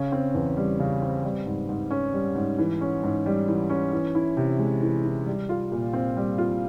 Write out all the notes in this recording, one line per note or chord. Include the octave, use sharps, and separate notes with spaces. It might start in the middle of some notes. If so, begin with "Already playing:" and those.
Already playing: C#3 C#4
C4
E2
G3
C#3
C4
G3
G#2
G#2
C#4
G3
G#2
E3
C#4
G#2
G3
E3
C#4
E3
E4
C3
G#3
E3
E4
G3
F4
A#2
C4
G3
F4